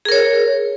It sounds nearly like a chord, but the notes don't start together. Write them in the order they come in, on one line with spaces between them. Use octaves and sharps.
G#4 A#4 C#5